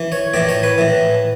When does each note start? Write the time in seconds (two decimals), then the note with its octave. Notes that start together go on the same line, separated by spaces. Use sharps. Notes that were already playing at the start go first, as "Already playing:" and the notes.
Already playing: E3
0.12 C#5
0.34 A2 E3 D5
0.49 C#5
0.63 B4
0.78 A2 E3